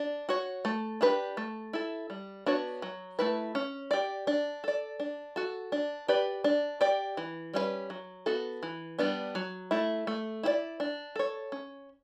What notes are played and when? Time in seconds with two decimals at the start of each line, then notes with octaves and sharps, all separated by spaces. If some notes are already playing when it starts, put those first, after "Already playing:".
Already playing: D4
0.29 F#4 C#5
0.65 A3
1.01 D4 G4 B4
1.37 A3
1.73 E4 A4
2.10 G3
2.46 B3 D4 F#4 C#5
2.82 F#3
3.19 A3 E4 B4
3.55 C#4
3.91 G4 D5
4.27 D4
4.64 A4 D5
5.00 D4
5.36 F#4 A4
5.72 D4
6.08 G4 B4 D5
6.44 D4
6.81 G4 D5
7.17 E3
7.54 G3 C#4 E4 B4
7.90 F#3
8.26 B3 F#4 A4
8.63 E3
8.99 G3 B3 D4
9.35 F#3
9.71 A3 E4
10.07 A3
10.43 E4 G4 D5
10.80 D4
11.16 A4 C#5
11.52 C#4